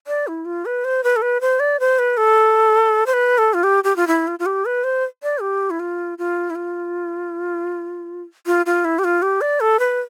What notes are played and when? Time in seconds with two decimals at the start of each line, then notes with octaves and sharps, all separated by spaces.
0.07 D5
0.27 E4
0.45 F4
0.65 B4
0.84 C5
1.04 B4
1.16 A4
1.22 B4
1.41 C5
1.60 D5
1.80 C5
1.99 B4
2.17 A4
3.06 C5
3.13 B4
3.38 A4
3.54 F4
3.63 G4
3.84 G4
3.96 F4
4.07 E4
4.27 F4
4.39 F4
4.46 G4
4.65 B4
4.84 C5
5.23 D5
5.41 G4
5.70 E4
5.79 F4
6.18 F4
6.50 E4
6.55 F4
8.46 F4
8.66 F4
8.84 E4
8.99 G4
9.04 F4
9.22 G4
9.41 D5
9.60 A4
9.79 B4